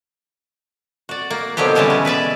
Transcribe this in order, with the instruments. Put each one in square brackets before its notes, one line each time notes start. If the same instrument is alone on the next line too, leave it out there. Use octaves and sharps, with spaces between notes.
[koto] F#4 D5
A#3
B2 D3 F3 F#3 G4
C#3 E3 G3 G#3 B3 E4
C#4
B2 B4 D5 E5